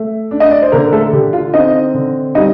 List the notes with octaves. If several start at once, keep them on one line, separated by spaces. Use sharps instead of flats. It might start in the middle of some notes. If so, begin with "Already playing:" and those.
Already playing: A3
D4
D#5
D5
C5
D3 A#3 A#4
A3 A4
D3 G4
F4 F5
C4 D#4 D#5
D3
G3 D#4 D#5